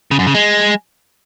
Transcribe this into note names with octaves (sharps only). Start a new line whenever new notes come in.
C#3
F#2
C#3
G#3